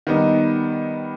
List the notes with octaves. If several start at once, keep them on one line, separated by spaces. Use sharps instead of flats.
D#3 G3 B3 D#4